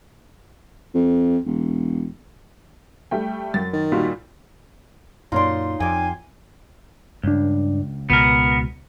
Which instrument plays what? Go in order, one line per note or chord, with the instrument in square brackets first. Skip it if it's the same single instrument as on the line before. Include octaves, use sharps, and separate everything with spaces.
[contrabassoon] F2
E1
[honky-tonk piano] G3 A3 G5
[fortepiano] F#2 [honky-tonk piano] A6
[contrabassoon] D#3
[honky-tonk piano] A#2 G3 [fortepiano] F4 F#4 A#4
[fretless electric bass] F#2 A#2 [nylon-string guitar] D#4 C#5 D5 [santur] F4 C6
[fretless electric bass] F2 [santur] G5 D6 [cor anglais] G#5
[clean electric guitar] C#2 [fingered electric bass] G2 D4
[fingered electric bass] C#2 B2 [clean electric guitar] B3 A#4